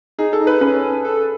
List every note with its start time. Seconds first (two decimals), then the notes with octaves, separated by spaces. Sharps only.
0.18 D#4 G#4
0.33 A4
0.40 D#4
0.47 B4
0.61 C#4 B4
1.04 A4